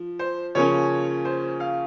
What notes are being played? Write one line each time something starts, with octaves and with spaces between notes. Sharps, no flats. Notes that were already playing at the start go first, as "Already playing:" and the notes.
Already playing: F3
C5
C#3 F3 A#3 C#4 C#5
C5
F5